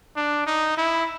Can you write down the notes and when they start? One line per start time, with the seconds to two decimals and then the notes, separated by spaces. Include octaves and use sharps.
0.16 D4
0.46 D#4
0.77 E4